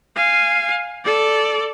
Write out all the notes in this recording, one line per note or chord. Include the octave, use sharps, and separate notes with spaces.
F5 G#5
A4 D5